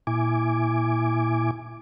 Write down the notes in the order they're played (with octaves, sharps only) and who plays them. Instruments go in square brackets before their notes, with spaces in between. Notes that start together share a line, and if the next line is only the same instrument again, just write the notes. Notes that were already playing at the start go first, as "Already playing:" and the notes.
[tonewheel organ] A#2 E4 G#5 D6